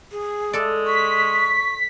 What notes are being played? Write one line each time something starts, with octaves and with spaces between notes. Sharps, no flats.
G#4
G#3 A4 D5
C#6 B6